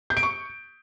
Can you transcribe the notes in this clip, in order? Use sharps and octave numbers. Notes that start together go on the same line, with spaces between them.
G6
D7
C#6